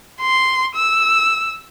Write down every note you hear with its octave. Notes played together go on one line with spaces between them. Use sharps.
C6
E6